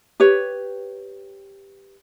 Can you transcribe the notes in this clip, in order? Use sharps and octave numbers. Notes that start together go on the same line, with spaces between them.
G4 B4 C#5